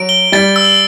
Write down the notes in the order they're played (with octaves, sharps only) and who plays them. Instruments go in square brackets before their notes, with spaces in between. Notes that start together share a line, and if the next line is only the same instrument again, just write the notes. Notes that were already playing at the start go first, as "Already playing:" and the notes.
Already playing: [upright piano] F#3 [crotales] D7
[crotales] G7
[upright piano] G3 [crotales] A6
[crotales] E6